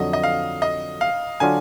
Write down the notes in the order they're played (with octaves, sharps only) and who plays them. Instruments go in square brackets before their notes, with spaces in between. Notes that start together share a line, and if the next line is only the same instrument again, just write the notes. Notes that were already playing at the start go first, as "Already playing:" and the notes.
Already playing: [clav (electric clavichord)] F2 D3 F#3 [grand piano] D#5
[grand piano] D#5
F5
D#5
F5
[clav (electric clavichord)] D3 F#3 D4 F4 [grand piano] G#5